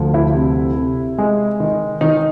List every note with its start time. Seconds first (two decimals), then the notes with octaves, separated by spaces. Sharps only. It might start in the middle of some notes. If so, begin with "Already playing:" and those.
Already playing: D2 F3
0.14 E4
0.34 C3
0.76 C3
1.18 G#3
1.60 D#3
2.01 D#3 D#4